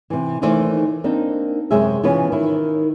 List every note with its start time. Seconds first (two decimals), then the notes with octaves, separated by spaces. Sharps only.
0.10 C3 E3
0.42 D#2 D#3 E3 A3 C5 D5
1.04 A#3 C4 D4 D#4
1.71 F#2 C3 G#3 G#4 E5
2.03 B2 E3 B3 C#4 F4 B4
2.32 D#3 E4